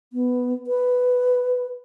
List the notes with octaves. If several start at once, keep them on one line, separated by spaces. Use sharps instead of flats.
B3
B4